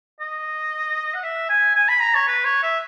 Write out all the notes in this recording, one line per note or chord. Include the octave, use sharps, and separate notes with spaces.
D#5
F#5
E5
G#5
G#5
B5
A#5
C#5
B4
C#5
E5